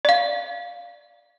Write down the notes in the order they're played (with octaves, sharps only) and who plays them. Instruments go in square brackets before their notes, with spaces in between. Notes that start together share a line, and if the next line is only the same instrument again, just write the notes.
[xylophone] D5 F5